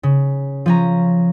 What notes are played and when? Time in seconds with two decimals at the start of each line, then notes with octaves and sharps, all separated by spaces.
0.03 C#3
0.66 F3 C#4 A#5